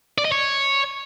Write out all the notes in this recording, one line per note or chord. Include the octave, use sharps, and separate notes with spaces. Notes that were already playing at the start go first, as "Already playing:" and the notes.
D5
D#5
C#5